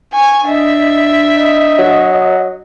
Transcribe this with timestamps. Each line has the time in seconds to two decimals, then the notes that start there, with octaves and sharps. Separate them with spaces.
0.12 G#5 C#6
0.46 D4 D#5 E5
1.34 D#5
1.78 F#3